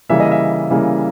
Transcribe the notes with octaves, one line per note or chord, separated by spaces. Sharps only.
C#3 E3 G3 A#3 E5
D#5
E5
C#3 E3 G3 A#3